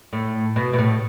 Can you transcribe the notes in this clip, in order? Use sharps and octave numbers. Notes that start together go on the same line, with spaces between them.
A2
B2
B2
A2